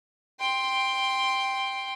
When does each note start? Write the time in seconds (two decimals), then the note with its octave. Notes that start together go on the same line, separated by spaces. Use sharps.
0.40 G5 C6